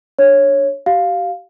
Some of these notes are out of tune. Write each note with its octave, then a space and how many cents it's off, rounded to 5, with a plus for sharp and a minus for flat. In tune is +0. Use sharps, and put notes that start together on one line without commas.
D4 +0 C#5 -5
G4 -40 F5 +5